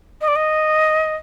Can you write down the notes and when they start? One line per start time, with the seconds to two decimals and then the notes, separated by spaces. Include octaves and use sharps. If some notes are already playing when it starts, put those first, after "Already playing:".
0.21 D#5
0.28 D5
0.36 D#5